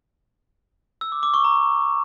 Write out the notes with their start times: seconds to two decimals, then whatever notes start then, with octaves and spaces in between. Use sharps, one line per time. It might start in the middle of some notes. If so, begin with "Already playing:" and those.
1.01 E6
1.12 D6
1.23 D6
1.34 C#6
1.44 A#5